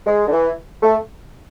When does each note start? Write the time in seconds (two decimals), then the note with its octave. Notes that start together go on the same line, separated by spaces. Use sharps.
0.06 G#3
0.27 D3
0.32 E3
0.83 A3